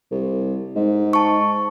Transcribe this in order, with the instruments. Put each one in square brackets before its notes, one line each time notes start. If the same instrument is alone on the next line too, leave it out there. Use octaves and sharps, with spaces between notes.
[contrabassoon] C2
G#2
[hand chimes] A5 C#6